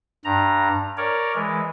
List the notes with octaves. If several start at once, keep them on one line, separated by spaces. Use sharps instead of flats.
G2 A#5
A#4 C#5 D5
E3 G#3